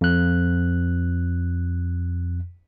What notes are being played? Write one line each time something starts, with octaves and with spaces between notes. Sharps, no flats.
F2 F#6